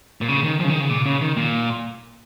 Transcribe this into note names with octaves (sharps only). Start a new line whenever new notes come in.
A#2
C#3
D#3
F3
C#3
D#3
C#3
A#2
C#3
D#3
A#2